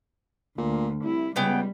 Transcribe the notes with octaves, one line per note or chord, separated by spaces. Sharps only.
D2 A#2
C2 E4
C#2 C#3 G3 B3 G5